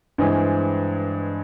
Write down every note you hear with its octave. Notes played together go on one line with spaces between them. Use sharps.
G2 E3 G#3 C4